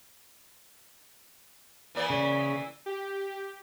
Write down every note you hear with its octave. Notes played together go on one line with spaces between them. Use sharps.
E3 A#3 D5
C#3
G4